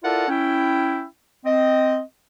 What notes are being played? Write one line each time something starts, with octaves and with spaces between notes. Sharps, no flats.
E4 F4 A4 A#4 D5 F#5
C#4 E4 G5
C4 D#5